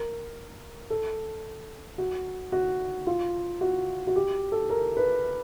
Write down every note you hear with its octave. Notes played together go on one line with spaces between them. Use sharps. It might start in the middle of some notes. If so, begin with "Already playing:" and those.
Already playing: A#4
A4
F#4
F#4
F4
F#4
F#4
G4
A4
A#4
B4